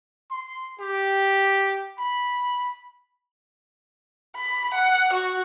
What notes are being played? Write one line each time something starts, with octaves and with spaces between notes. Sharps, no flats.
C6
G4
B5
B5
F#5
F#4